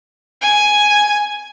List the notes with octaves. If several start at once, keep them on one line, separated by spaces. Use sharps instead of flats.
G#5